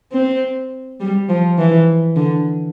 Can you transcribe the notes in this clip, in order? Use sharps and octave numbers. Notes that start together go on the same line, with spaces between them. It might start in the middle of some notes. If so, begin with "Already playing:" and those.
C4
G3
F3
E3
D3